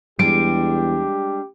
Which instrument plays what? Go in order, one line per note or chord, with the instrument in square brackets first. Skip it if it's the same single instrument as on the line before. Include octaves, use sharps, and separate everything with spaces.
[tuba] E2 [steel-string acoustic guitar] G3 G#3 D4 [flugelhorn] G4 [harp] D7